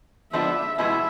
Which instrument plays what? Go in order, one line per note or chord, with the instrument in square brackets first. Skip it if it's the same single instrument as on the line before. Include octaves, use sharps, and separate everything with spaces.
[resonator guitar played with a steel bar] F3 G#3 B3 D4 [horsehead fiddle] E5
[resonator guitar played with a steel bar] B2 G#3 B3 E4 G#4 [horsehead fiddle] E5